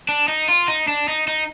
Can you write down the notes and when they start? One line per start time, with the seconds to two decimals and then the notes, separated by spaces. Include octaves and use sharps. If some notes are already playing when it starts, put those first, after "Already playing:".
0.09 D4
0.28 D#4
0.49 F4
0.68 D#4
0.88 D4
1.08 D#4
1.28 D#4